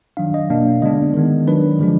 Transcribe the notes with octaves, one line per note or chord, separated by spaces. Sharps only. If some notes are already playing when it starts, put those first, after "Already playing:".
D#3 F#3 D4 F5
D#5
B2 A#3 D4 F5
D3 G#3 B3 D4 D#5
D#3 G#3 B3
D#3 F#3 D4 B4
D3 F3 G#3 D4